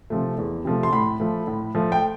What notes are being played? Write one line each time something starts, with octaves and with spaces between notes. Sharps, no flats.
C3 F3 A3
E2
C3 F3 A3
C6
A2 B5
F3 A3
A2
F3 A3
G5